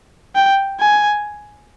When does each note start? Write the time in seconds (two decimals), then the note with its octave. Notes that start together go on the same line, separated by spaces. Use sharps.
0.35 G5
0.80 G#5